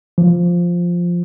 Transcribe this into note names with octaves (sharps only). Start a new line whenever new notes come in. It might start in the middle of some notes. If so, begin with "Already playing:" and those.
F3